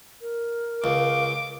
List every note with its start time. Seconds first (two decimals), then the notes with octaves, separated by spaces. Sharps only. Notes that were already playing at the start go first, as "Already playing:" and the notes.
0.22 A#4
0.84 C#2 F5 D6